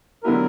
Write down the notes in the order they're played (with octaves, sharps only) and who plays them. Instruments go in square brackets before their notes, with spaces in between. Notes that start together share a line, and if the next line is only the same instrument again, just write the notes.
[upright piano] D3 F#3 B3 E4 G4 [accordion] A#4